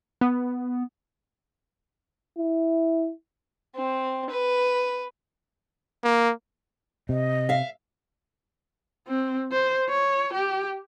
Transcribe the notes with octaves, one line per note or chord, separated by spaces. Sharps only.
B3
E4
C4
B4
A#3
C3 D#5
E5 F5
C4
C5
C#5
G4